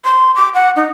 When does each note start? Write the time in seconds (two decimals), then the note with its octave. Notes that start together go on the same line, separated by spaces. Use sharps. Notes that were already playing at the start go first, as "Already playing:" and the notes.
0.05 C6
0.36 D6
0.54 F#5
0.76 D#4